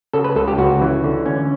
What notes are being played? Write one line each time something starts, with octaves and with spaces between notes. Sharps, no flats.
C#3 A4
B4
C#2 A4
G4
C#2 F#4
E3
D3
C#4